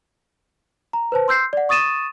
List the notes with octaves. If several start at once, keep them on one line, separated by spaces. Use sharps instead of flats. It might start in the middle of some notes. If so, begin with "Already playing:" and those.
A#5
B4 C5 A5
C6 E6 G6 C7
D5 F#5
C#6 D#6 A6 D#7 E7